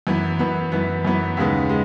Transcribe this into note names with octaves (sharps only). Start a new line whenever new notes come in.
F#2 E3 B3
F#2 E3 B3
F#2 E3 B3
F#2 E3 B3
D#2 C#3 G#3 B3
G#3